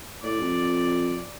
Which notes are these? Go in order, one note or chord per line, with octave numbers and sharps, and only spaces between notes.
A2 D5
F2